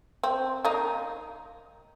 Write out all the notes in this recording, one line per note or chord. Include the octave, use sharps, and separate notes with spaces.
C4
A#3 D#4